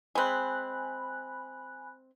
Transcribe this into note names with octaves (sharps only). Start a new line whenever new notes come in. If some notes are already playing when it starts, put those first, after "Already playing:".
G#3 C4 G#5 B5 F#6